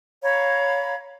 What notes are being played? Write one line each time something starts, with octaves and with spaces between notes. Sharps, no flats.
C#5 F5 A#5 B5